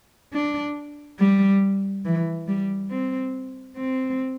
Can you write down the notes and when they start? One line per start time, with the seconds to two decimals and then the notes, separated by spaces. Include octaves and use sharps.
0.33 D4
1.19 G3
2.05 E3
2.48 G3
2.90 C4
3.76 C4